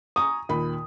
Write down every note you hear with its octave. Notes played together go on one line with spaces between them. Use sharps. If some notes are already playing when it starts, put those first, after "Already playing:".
G#5 A#5 C#6 D#6
D#2 A#2 B5